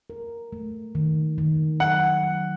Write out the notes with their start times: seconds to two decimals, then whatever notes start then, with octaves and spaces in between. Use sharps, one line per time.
0.10 A#4
0.52 A3
0.95 D#3
1.38 D#3
1.80 F#3 F#5
2.23 F#3